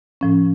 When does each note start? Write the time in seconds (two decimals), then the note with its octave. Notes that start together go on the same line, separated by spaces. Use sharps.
0.21 A2 F3 C#4